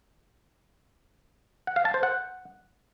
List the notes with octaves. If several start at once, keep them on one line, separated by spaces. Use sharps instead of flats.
F#5
F5
A5
C5
F#5